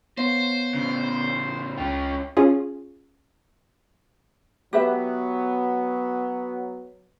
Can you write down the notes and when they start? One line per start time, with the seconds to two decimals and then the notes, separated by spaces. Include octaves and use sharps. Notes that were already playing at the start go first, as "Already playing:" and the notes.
0.17 B3 C5 C#5 F5
0.74 A2 C#3
1.78 C#2 C#4 F4 G5
2.37 C#4 F4 G#4
4.73 F#3 B3 G4 B4 E5